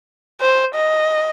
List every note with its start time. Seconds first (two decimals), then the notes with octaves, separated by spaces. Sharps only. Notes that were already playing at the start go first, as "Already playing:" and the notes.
0.41 C5
0.75 D#5